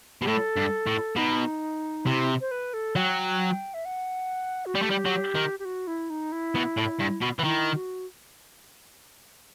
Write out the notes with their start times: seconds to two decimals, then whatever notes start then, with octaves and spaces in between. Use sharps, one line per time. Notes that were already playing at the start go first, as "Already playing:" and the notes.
0.22 B2 G4
0.27 A2 A4
0.57 G2
0.87 A2
1.16 B2 D#4
2.06 C3 E4
2.41 C5
2.51 B4
2.74 A4
2.96 F#3 G5
3.74 E5
3.85 F#5
4.66 F#4
4.75 G3 G4
4.82 A3
4.90 G3
5.05 F#3
5.35 D#3
5.59 G4
5.65 F#4
5.87 E4
6.10 D#4
6.32 E4
6.55 B2
6.77 A2
6.99 G2
7.21 B2
7.39 E3
7.44 D#3 E4
7.75 F#4